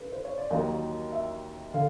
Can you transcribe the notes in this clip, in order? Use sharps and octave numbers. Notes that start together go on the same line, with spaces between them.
B4
C5
C#5
D5
D#2 D#3 F#3 D#5
E5
D3 F5